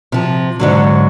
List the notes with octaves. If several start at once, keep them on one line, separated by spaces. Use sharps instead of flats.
C3 F3
G#2 D3 F#3